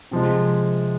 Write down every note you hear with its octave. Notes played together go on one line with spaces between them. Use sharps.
C3 F3 G#3